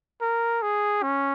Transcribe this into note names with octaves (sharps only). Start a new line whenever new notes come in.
A#4
G#4
C#4